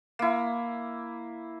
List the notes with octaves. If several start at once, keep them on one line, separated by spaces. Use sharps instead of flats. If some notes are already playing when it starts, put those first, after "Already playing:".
A#3 E4